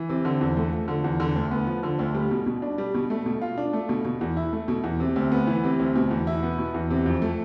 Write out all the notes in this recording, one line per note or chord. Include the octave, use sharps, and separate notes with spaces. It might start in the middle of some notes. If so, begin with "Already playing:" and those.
Already playing: E3
C3
D3
E2
A3
F3
D3
E2
D3
D2
B3
F3
D3
D2
G3
B2
B2
D4
G3
B2
A3
B2
F4
D4
A3
B2
B2
E2
E4
A3
B2
E2
C3
D2
B3
E3
C3
D2
B2
E2
E4
B3
B2
E2
C3
F2
A3